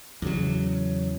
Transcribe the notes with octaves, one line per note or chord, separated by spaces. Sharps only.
E2 C#3 F#3